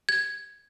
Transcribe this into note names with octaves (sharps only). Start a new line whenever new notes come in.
G#6